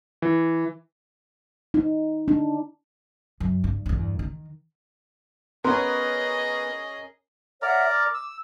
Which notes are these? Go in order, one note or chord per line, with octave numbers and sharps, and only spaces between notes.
E3
D#4
D4
F#2
G2
E2 G2
D#3
B3 C#4 G#4 A#4 D#5 C6
A#4 C#5 D5 E5 F#5 A#5
D6
E6